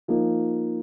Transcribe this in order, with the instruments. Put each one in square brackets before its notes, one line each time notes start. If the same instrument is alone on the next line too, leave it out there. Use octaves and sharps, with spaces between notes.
[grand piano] F3 A#3 D#4